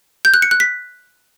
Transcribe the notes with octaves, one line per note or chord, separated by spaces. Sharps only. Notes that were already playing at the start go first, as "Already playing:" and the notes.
G6
F#6
C#7
F#6
B6